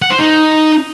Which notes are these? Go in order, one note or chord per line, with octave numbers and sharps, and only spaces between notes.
F#5
C5
D#4